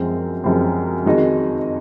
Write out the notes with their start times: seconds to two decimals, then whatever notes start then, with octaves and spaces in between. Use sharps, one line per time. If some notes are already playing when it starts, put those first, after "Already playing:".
Already playing: F#2 F3 G#3 C4
0.44 F#2 F3 G#3 C4
1.06 F2 D#3 G#3 D#4 F#4